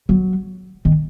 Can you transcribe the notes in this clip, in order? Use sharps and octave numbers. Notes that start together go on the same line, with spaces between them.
F#3
D#3